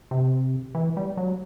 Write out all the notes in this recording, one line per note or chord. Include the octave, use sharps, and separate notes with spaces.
C3
E3
G3
F#3